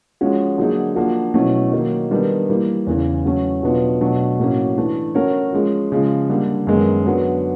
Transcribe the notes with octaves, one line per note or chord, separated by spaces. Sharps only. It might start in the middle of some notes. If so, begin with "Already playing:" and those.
F3 G#3 C#4 F#4
D3 F#3 A#3 D#4 G#4
F3 A#3 D4 F#4
B2 F#3 A3 C#4 E4
D#3 F#3 A#3
D#3 G3 B3 D4
E3 G3 A#3
E2 C#3 E3
F#3 A3 C#4
B2 F#3 B3 D4 F4
B2 F#3 A3 D4
A2 F#3 A#3 C#4
E3 A3 D4
A3 C#4 F#4 A#4 C#5
F3 G#3 C#4
C#3 F3 G#3
D3 G3 A#3
F#2 D#3 G#3 B3
D3 F#3 B3